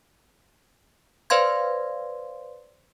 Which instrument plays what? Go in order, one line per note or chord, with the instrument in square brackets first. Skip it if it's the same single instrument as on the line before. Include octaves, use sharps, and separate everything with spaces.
[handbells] B4 C5 D5 F5 C6 G#6